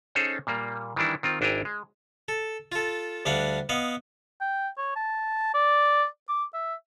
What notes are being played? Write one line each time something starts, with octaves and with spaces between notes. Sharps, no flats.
C#4 D#4 G#4 A4 C5 C#5
A#2 G3 A#3
D#3 E3 G3 D4 E4
D#3 C4 F4
G#1 D4 E4 G5 G#5 A#5
G#3
A4
F4 A4
D2 G3 D4 F5 F#5
B3 D#5 F5 F#5
G5
C#5
A5
D5
D6
E5